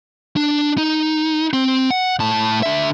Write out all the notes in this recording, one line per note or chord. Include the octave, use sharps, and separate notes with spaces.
D4
D#4
C4
F#5
A2 A5
D3 E5